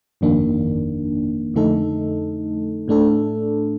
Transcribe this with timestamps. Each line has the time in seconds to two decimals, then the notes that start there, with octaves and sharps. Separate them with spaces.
0.21 G1 F2 D#3 A#3 D4
1.54 F2 D3 A3 D#4 A4
2.88 A2 A3 D4 A4